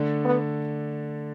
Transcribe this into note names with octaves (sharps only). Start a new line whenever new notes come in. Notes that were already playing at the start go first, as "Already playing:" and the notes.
Already playing: D3 A3 D4
B3